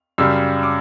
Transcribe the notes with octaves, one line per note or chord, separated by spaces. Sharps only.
F#2 C#3 G3 E6
D6